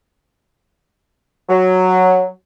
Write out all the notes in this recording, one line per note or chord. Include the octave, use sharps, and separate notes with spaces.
F#3